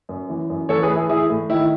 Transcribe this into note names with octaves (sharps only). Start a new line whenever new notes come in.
F#2
E3
F#2
E3 A4 C#5
G#4 B4
A2
E4 G#4
E3 E4 G#4
A2
D#3 E4